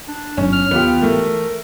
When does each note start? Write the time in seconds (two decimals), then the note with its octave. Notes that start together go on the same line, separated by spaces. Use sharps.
0.08 D4
0.37 G1 F#3 C#4
0.53 F6
0.71 D#2 B3 F4 G4
1.02 E3 G#3 A3 A#4